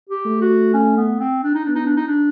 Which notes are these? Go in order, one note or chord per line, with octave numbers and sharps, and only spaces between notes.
G4
A3
F#4
C#4
B3
C4
D4
D#4
B3 D4
D#4
D4
D#4
D4